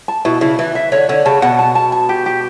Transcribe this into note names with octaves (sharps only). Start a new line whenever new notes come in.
A5
B2 E4
C#3 E4
E3 E4
E5
D3 C#5
D3 C#5
C#3 A5
B2 F#5
A5
A5
A5
G4
G4